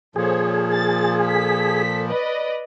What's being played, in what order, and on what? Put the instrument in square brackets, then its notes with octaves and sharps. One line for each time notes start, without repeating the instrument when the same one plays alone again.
[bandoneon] A#2 F3 [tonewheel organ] G#4 [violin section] A4 C5 C#5
[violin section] A6
A4 B6
B4 D5 D#5